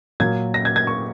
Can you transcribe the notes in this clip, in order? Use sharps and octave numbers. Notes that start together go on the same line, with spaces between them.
A#2 F#3 G#6
A#6
G#6
G#6
C#6